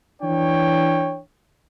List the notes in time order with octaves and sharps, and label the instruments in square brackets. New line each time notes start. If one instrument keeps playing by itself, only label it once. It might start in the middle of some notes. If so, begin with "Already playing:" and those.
[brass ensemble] E3 D4 C#5 G5